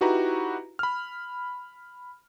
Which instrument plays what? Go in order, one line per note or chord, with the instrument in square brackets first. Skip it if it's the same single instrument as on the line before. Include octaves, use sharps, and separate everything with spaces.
[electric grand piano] D#4 E4 F#4 G4 B4 A#5
B5 F6